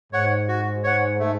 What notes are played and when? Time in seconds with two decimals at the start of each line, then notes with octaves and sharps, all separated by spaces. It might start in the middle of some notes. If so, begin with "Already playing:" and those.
0.12 G#2 C#5 F#5
0.48 F#4
0.84 C#5 F#5
1.19 A3